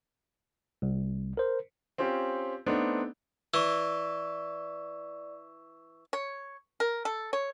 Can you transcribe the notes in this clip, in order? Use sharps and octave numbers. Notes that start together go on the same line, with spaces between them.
C2
A#4 C5
C4 C#4 F4 G4
A3 B3 C4 D4 D#4
E3 D5 C#6 E6
C#5
A#4
A4
C#5